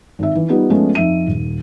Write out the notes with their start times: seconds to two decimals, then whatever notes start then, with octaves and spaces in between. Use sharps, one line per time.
0.19 G#1 E5
0.35 E3
0.48 G3 B3 D#4 F4
0.70 F3 G#3 A3 B3 C#4
0.95 F2 D#4 E5 D#7
1.28 D#1